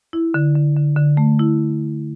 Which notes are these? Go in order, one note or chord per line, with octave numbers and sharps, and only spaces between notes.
E4
D3
D3
D3
D3
A3
E4